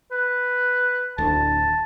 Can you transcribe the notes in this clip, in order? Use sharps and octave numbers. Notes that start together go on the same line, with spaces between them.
B4
D1 D2 A5